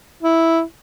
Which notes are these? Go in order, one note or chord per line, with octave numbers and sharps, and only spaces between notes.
E4